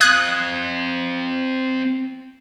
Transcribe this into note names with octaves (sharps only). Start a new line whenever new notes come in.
C4 F5 D#6 F#6 G#6